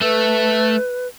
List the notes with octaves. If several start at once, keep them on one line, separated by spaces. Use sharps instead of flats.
A3 A4 B4